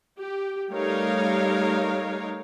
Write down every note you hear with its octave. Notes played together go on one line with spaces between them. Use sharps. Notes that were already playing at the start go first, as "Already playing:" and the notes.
G4
G3 A3 D#4 A#4 C#5 F5